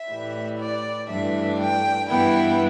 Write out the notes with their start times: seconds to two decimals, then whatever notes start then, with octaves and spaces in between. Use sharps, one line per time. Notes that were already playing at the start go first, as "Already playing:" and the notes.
Already playing: E5
0.10 A2 E3 G3
0.60 D5
1.09 G2 E3 A3 D4 E5
1.60 G5
2.09 G2 E3 B3 E4 G5